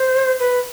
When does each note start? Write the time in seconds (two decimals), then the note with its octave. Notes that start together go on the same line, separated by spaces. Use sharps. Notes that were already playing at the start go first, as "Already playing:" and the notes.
Already playing: C5
0.39 B4